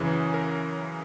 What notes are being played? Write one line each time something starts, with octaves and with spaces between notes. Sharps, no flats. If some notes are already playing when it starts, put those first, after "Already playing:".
Already playing: F#2 C#3 E3 G#4
A#4